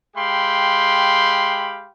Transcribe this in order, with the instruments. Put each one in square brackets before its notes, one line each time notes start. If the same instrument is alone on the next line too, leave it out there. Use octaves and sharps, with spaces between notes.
[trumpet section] G#3 G4 F5 G5 B5 C6